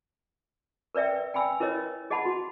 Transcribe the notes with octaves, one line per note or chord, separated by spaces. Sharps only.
A#4 B4 D5 E5 G5
G5 G#5 B5 E6
E4 A#4 B4 C#5 D#5
G#4 D#5 F#5 A5 B5
F#4